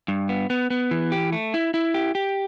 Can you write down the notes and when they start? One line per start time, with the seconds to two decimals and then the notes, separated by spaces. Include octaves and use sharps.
0.08 G2
0.29 B3
0.50 B3
0.70 B3
0.91 E3
1.12 G4
1.32 A3
1.54 E4
1.74 E4
1.94 G4
2.15 G4